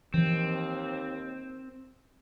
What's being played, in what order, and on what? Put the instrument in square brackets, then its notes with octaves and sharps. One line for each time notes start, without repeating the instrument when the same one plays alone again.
[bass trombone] D#2 [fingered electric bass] E3 F3 [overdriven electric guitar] C4